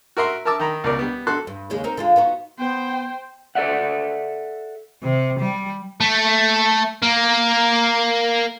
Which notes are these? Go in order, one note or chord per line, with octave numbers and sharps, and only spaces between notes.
F#4 A#4 E5 C6
A#4 E5 A5 D6 E6
D#3 A#5 B5
C#2 B2 A#4 D5
G3 B3
F#4 A4 C6 F#6
G2
D#2 C#3 G#3
C4 D#4 A#4
D3 G#3 F4
B3 D#4 F#4
B3 C5 G5
A4 D5 E5 F#5
C3
G3
A3
A#3